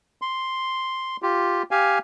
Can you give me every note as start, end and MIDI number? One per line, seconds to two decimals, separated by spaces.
0.22 1.17 84
1.22 1.63 65
1.22 1.63 67
1.71 1.99 67
1.71 1.99 77
1.71 1.99 80